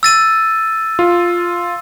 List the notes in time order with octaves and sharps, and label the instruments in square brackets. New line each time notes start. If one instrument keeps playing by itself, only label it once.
[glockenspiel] E6 A6 D#7
[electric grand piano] F4